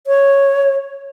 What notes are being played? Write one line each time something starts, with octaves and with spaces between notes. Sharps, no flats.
C#5